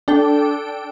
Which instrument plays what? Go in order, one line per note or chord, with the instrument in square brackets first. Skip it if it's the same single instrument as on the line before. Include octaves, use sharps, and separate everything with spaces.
[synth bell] D4 A4 G5